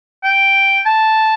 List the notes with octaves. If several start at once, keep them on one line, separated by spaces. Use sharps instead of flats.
G5
A5